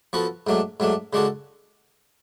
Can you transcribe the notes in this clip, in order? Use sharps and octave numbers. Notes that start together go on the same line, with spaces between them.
F3 B3 F#4 A4
G#2 F#3 A3 D4
G#2 F#3 A3 D4
C#3 G#3 D4 F#4 A4